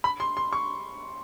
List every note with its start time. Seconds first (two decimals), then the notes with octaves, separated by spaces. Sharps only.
0.04 B5
0.20 C6
0.37 C6
0.53 C#6